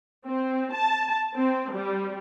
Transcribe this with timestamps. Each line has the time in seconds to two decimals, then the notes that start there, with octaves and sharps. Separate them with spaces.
0.24 C4
0.73 A5
1.36 C4
1.74 G3